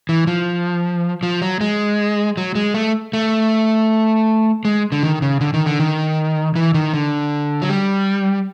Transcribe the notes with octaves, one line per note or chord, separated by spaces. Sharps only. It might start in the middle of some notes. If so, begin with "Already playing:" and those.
E3
F3
F3
F#3
G#3
F#3
G#3
A3
A3
G#3
D3
D#3
C#3
D3
D#3
D3
D#3
E3
D#3
D3
F#3
G3